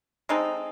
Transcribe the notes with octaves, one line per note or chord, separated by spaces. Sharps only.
G#3 C4 D#4 A4